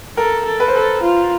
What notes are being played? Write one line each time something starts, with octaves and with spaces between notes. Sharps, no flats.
A4 A#4
A4
B4
C5
A4 B4
F4